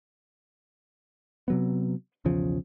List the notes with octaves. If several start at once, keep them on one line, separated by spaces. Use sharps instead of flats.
C3 F#3 B3
B1 E2 C#3 F3